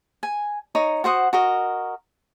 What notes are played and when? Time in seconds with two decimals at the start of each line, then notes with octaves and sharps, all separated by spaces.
0.23 G#5
0.75 D#4 C#5 A#5 D#6
1.04 F#4 C5 F#5 D#6
1.33 F#4 A#4 D#5